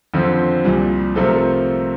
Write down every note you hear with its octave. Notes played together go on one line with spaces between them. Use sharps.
F2 D3 F3 C4
C2 A#2 G3
C3 F3 A3 C4 A4
A#4